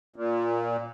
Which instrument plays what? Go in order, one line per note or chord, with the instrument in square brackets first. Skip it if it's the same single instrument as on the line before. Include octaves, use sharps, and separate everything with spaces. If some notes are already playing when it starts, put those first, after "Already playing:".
[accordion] A#2